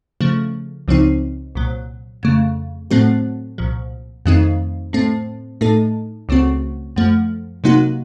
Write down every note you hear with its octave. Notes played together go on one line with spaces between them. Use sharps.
C#3 F3 A3
C#2 C#3 F3 C4 D#4
C2 A#2 F#3
F2 C#3 A3
A2 F#3 A3 C4 F#4
C2 A#2 F3
F2 D#3 A3 C4 D#4
A2 A3 C4
A2 A3 D#4 A4
C#2 C#3 A3 C4 F#4
F#2 F3 A3
C3 F#3 A#3 D#4 F#4